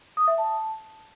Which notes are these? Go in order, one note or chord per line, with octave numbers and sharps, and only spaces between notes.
D#6
E5
A5